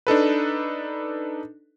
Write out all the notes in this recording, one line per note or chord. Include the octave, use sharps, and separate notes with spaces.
D4 D#4 A4 B4